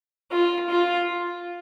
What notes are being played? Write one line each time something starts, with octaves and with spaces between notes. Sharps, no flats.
F4
F4